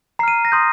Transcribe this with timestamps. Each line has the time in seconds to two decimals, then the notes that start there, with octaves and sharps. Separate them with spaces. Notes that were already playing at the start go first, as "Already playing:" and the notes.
0.19 A#5 C7
0.23 F6 D#7
0.45 A#6
0.52 C6 D#6 G6